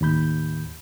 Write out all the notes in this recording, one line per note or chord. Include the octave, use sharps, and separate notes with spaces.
D#2 A2 B5 G6